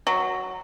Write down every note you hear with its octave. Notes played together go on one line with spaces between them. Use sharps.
F#3